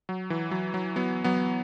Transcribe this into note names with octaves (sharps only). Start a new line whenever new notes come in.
F#3
E3
F#3
F#3
F#3 B3
F#3 B3